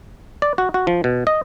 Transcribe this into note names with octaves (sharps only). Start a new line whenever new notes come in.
D5
F#4
F#4
F3
B2
D#5